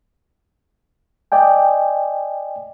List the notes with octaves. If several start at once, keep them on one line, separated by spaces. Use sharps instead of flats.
D5 D#5 G5 G#5